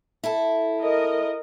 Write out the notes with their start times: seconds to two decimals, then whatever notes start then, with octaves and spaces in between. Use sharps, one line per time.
0.24 E4 A4
0.80 A#4 D#5